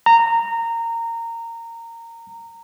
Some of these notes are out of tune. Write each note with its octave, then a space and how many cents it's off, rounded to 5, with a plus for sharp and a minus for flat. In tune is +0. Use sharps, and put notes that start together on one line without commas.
A#5 -20